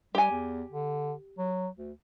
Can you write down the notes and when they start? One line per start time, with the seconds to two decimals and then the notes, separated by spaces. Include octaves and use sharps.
0.15 G3 G4 G#5
0.31 E2
0.70 D3
1.38 F#3
1.77 D2